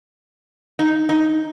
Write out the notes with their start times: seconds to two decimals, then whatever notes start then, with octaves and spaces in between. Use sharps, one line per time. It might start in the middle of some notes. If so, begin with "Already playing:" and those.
0.79 D#4
1.09 D#4